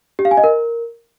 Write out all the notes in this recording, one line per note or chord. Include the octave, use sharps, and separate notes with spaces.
G4
F5
G#5
D#5
A#4